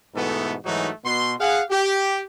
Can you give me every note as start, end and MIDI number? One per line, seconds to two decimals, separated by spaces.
0.15 0.54 44
0.15 0.54 47
0.15 0.54 52
0.15 0.54 57
0.15 0.54 59
0.15 0.54 69
0.65 0.89 44
0.65 0.89 52
0.65 0.89 54
0.65 0.89 57
0.65 0.89 63
0.65 0.89 66
1.04 1.34 47
1.04 1.34 84
1.40 1.61 68
1.40 1.61 77
1.40 1.61 78
1.71 2.21 67